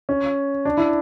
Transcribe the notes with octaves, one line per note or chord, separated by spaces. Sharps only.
C#4
D4
E4